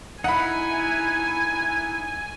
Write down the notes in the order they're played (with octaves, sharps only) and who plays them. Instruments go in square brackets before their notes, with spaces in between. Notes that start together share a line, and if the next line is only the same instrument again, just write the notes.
[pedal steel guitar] D#4 E4 [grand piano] F#5 B5 [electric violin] G#5